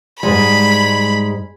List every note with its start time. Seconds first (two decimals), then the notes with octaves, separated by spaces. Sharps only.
0.23 G#2 G3 G#3 B5